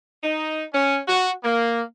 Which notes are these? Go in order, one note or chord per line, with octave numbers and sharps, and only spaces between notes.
D#4
C#4
F#4
A#3